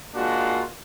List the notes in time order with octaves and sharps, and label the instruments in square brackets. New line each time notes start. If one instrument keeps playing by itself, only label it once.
[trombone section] G#3 A#3 D4 F4 F#4